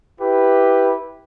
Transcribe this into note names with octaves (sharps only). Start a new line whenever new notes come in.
E4 G4 B4